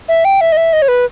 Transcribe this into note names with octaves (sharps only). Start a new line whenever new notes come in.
E5
G5
E5
D#5
E5
D#5
C#5
B4